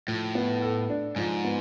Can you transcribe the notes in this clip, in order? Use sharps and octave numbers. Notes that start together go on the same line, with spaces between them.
A2 F3
B3
A4
D4
G#2 F3
B3